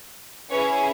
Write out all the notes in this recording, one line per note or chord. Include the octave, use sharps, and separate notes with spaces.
C#4 E4 G#4 B4 C#5